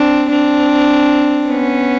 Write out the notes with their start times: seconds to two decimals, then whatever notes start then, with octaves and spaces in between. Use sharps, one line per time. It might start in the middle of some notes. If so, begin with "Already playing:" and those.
Already playing: C4 D4
0.30 C4 D4
1.47 B3 C#4